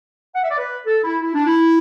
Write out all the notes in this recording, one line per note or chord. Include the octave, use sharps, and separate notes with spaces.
F#5
E5
D5
B4
A4
E4
E4
D4
E4